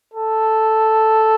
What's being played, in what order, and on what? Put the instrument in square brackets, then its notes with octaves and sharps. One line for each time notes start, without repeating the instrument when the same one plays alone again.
[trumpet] A4